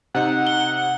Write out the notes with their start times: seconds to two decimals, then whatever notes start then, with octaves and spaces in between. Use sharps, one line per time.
0.15 C3 D#4 F#5
0.47 G7